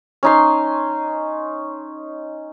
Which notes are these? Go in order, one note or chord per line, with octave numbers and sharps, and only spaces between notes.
C#4 D#4 C6